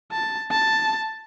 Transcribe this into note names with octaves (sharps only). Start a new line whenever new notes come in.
A5
A5